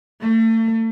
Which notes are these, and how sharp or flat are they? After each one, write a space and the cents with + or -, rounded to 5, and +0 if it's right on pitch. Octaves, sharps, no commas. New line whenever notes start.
A3 +40